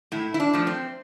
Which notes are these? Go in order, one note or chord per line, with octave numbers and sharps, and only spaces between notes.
A2 E4
E4
D4
F3 A3
C4